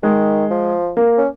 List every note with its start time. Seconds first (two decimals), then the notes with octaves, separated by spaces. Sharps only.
0.03 D#3 G#3
0.50 F3
0.97 A#3
1.18 C#4